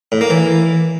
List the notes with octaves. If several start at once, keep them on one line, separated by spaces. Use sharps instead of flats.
A2
A#3
E3